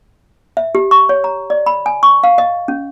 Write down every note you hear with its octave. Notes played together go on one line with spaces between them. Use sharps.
E5
G4
C#6
C#5
A#5
D5
B5
G#5
C#6
F5
D#5
C#4